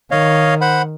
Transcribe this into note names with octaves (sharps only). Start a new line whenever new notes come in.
D#3 C#5 D#5 F5
C5 F#5 B5